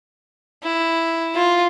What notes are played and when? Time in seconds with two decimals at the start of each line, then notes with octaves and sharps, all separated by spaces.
0.63 E4
1.35 F4